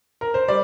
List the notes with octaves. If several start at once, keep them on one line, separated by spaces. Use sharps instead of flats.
A#4
C5
G3 D5